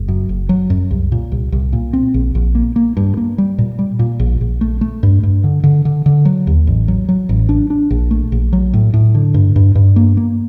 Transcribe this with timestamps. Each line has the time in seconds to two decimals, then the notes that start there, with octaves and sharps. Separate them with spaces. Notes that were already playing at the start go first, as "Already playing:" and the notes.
Already playing: F#1
0.08 F#2
0.29 F#1
0.49 F#3
0.70 F#2
0.91 C2
1.12 A#2
1.32 C2
1.52 C2
1.73 A#2
1.93 C4
2.14 A#1
2.35 A#1
2.55 A#3
2.76 A#3
2.97 G2
3.17 A#3
3.38 G3
3.58 A#2
3.79 G3
3.99 A#2
4.20 A#1
4.41 A#1
4.61 A3
4.81 A3
5.03 G2
5.23 G2
5.44 D3
5.64 D3
5.85 D3
6.06 D3
6.25 F#3
6.47 D#2
6.67 A1
6.88 F#3
7.09 F#3
7.29 A1
7.49 D4
7.70 D4
7.91 A#1
8.11 A3
8.32 A#1
8.53 F#3
8.74 A2
8.94 A2
9.15 D3
9.34 G2
9.56 G2
9.75 G2
9.96 A#3
10.17 A#3